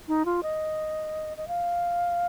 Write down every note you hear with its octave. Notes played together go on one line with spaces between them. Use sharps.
D#4
F4
D#5
D#5
F5